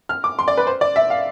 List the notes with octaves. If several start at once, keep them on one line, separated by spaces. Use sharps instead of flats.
F6
D6
C6
D5
B4
C5
D5
E5
F5